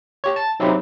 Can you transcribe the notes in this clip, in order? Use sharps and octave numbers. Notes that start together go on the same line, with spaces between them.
G4 C#5
A5
F#3 C4 D#4 E4 G4